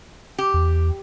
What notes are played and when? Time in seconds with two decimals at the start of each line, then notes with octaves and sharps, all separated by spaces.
0.38 G4
0.54 E2